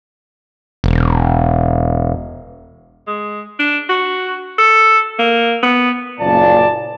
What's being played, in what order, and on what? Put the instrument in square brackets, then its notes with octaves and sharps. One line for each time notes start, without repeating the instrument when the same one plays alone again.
[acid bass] E1
[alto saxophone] G#3
D4
F#4
A4
A#3
B3
[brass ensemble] F#1 A#2 D5 A5